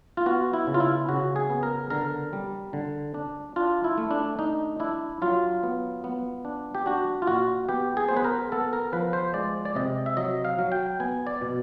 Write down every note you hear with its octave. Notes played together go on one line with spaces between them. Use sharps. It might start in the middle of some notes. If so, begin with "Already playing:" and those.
F4
B3 F#4
E4
C#3
F4
E4
C#3 F#4
G#4
B3
A#4
D3 A#4
G3
D3
D4
D4 F4
E4
A3
D4
D4 D#4
D4 E4
F#3 F4
B3
B3
D4
G4
D4 F#4
F4
A#2 F#4
B3 G4
G#4
B3 C5
B4
A#4
B3 A4
A#4
F3 B4
C5
G#3 D5
D5
C3 D#5
E5
F#3 D#5
F5
F#3
G5
B3 G#5
D5
B2